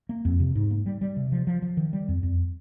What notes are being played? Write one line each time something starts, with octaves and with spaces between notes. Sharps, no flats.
A#3
F2
C3
G#2
A#3
G3
G3
C3
F3
F3
F3
D#3
G3
F2
F2